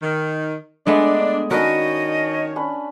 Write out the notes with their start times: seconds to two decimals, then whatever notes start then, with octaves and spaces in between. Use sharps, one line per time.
0.02 D#3
0.87 G#3 A3 B3 D4 D#5 E5 G#5
1.51 D#3 C#4 D4 F#4 A#4 B4 C#5 D#5
2.56 C#4 D4 B4